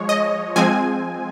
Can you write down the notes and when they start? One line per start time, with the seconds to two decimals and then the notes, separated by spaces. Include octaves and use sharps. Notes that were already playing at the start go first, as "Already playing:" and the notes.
Already playing: F3 G#3 C#5
0.09 D#5
0.56 F3 G#3 C4 G#5